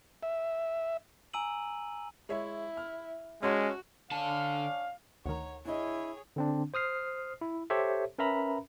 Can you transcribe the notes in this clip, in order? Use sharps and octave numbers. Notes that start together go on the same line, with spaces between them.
E5
G#5 A#5 E6 D#7 F#7
G#3 E4 C#5 E5
F6
G#3 C#4 F#4 C#5 A5 C6
D3 C#4 D4 F5 A5
D2 D#3 C#5 F#5 A#5
D4 E4 G#4 C#5 D#5
D3 C4 D4
C5 D#6 F6 C7
E4
G4 A4 C5 C#5 E5
C#4 A#4 B4 E5 A#5 B5